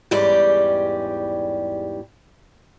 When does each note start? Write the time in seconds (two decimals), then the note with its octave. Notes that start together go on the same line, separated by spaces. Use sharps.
0.11 E2 G#2 G3 C#4 G4